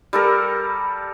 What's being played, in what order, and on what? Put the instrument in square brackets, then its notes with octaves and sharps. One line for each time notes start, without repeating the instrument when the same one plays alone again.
[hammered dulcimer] G3 A4 A#4